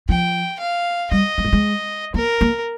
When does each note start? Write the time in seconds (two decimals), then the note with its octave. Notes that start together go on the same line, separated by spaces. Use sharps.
0.09 F3 G5
0.60 F5
1.11 G3 D#5
1.38 G#3
1.45 G3
1.53 G#3
2.14 A#3 A#4
2.41 A#3